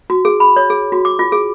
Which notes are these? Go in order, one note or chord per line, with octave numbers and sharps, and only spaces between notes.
F#4
G#4
B5
C#5
G#4
F#4
D6
F4
G#4